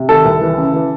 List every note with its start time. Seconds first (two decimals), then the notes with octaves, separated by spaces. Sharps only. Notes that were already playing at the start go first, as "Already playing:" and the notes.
Already playing: C3
0.09 D#3 A4
0.25 C2
0.41 E3
0.58 C#3
0.74 E3